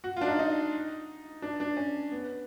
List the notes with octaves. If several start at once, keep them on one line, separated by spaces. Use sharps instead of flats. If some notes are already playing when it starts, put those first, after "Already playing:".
F#4
D4 F4
D#4
D#4
D4
D4
C#4
B3